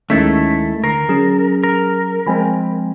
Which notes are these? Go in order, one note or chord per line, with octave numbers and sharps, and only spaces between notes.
D2 D#3 G#3 A3 C#4 E4 A4 B6
D3 A#4 C7
F#3 C#4 G#4
A#4
F3 G#3 C4 G#5 B5